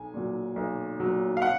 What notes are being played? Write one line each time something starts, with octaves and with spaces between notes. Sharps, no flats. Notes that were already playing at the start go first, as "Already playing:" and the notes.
Already playing: B1 G#5
A#2 F#3
B1
A#2 F#3
F5
F#5